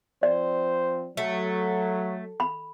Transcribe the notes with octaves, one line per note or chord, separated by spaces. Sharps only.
F3 C4 C5 D5
F#3 A3
B5